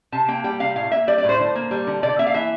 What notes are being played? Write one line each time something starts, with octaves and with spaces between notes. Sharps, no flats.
C3 A5
A#3 G5
G3 G5
C3 F5
A2 F5
A#3 E5
G3 D5
D5
A2
C5
D3
A#3
G3
D3
C3 D5
A#3 E5
F5
E3 E5